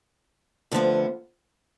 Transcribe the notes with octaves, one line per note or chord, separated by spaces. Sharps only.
D2 D3 F3 B3